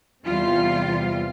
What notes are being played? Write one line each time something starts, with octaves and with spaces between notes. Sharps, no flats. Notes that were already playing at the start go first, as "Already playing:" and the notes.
E2 C3 G3 F4